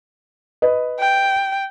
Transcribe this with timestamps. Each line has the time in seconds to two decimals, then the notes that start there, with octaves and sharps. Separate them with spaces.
0.62 B4 D#5
0.99 G5